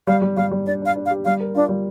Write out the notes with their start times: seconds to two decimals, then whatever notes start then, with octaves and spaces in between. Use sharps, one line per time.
0.07 G3 F5
0.22 G3
0.36 G3 F5
0.51 G3
0.66 D4 D5
0.81 D4 F5
0.96 D4
1.06 F5
1.11 G4
1.25 G3 F5
1.40 A#4
1.55 D4 F4
1.69 G3